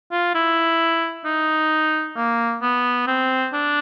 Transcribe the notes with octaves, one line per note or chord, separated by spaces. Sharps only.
F4
E4
D#4
A#3
B3
C4
D4